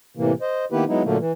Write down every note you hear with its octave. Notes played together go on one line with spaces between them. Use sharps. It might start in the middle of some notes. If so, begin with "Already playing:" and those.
A2 C3 E3 A#3
C5 D#5
D#3 A#3 B3 E4 G4 B4
F#3 G#3 B3 D#4 E4
A#2 D3 F#3 A3 A#3
E3